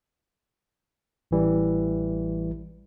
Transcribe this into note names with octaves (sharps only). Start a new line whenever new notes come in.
A1 E3 G3